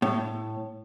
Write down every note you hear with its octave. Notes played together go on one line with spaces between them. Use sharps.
A2